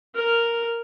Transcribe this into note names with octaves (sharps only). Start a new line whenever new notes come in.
A#4